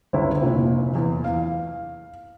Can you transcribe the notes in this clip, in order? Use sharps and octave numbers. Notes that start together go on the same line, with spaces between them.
G1 C#2 E4
F1 A#2
E2
F5